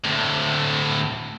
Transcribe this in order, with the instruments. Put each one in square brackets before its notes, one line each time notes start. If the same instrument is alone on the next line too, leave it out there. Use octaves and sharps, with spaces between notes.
[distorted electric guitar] D2 A2